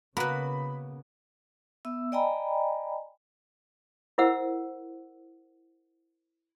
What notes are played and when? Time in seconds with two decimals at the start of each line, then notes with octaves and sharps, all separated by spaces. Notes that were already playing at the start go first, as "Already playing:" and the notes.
0.17 C#3 A#3 B3 F#4 A#4 B4 B5
1.85 B3 E5 E6
2.12 D5 D#5 G5 G#5 A#5 B5
4.18 E4 A#4 C5 F#5 E6